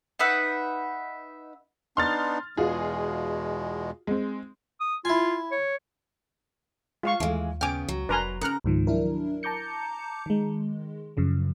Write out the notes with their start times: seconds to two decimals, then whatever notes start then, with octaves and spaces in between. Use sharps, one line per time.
0.19 D#4 B4 E5 F#5
1.97 B3 D4 D#4 C6 F6 A6
2.57 E2 B2 G#3 F4 F#4 G#4
4.07 G#3 C4
4.80 D#6
5.05 E4 F4 G#5
5.52 C#5
7.03 G#3 F4 F5 C#6
7.20 D#2 E3 G#3 A3
7.61 C#3 B3 G5 G#5 D6 F6
7.88 C#2 F#3
8.09 F1 D4 A#4 B4 G#5 A#5 C6
8.41 C#3 A#4 A#5 F6 F#6 C#7
8.64 C#2 G#2 D#3 F3
8.87 F#3 D4 E4 A#4
9.43 A5 A#5 D6 G6 C#7
10.26 D#3 G#3
11.17 F#2 C#3 F3